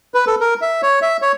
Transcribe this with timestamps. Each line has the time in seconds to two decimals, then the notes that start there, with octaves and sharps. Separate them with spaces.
0.14 B4
0.27 A4
0.41 A#4
0.61 E5
0.82 C#5
1.02 E5
1.22 C#5